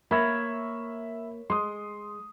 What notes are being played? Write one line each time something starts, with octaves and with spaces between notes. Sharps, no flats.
A#3 A#4 C#5 E5 B5
G#3 C6 D#6